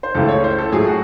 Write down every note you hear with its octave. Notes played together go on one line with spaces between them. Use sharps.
C5
C#2 C#3 E3 A3 A4
C#5
C5
A4
A2 F#3 A3 G#4
F#4